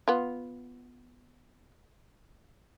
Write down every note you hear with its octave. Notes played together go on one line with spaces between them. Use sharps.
B3 F4